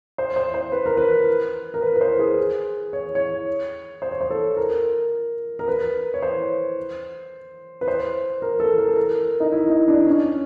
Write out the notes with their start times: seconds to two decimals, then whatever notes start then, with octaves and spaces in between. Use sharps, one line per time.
0.18 C5
0.36 C5
0.54 C5
0.72 B4
0.86 A#4
0.97 B4
1.74 A#4
1.82 B4
1.96 B4
2.01 C5
2.19 G#4
2.93 C#5
3.15 C#5
4.02 C5
4.11 C#5
4.21 C5
4.30 A4
4.57 A#4
5.59 A#4
5.68 B4
6.14 C#5
6.22 C5
7.81 B4
7.88 C5
8.42 A#4
8.60 A4
8.78 A#4
8.88 A4
8.96 A#4
9.40 D#4
9.52 E4
9.70 D#4
9.88 D4
10.06 C#4